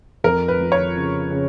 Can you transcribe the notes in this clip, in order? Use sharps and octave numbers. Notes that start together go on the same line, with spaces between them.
F2 A#4
B4
F3
C#5
C#3
C#3